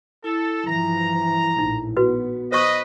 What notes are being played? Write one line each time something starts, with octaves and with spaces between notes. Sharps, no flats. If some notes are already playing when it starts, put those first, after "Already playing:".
E4 A4
G2 E3 F3 A#5
A#1 A2 D#4
B3 F#4 B4
B4 C5 D#5 C#6